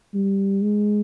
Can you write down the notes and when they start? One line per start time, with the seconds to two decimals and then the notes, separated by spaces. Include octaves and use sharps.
0.14 G3
0.62 G#3